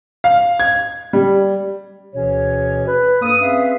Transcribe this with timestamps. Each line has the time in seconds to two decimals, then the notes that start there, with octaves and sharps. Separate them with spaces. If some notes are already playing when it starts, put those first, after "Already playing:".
0.24 F5
0.60 G#6
1.13 G3
2.14 D2 B2 E3 C#4 G#4 C#5
2.87 B4
3.22 G2 A#3 A4 D#6
3.41 C4 C#4 G#4 B4 E5 F5